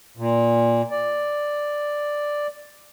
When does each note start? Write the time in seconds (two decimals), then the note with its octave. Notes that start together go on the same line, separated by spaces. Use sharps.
0.17 A#2
0.91 D5